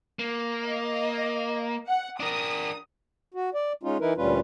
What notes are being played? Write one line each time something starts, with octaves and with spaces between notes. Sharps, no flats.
A#3
D#5
F#5
D4 A#4 D#6
F#4
D5
G#3 C#4 D#4 F4
E3 D#4 E4 A#4 B4
D2 A#2 G3 C#4 F4 B4